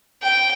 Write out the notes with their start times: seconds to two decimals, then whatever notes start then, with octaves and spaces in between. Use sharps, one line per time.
0.23 G5